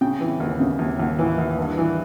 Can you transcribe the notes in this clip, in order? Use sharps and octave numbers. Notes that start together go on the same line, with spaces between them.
C#3 G5
E3
D#2
C#3
D#2
D#2
E3
D#2
G2
E3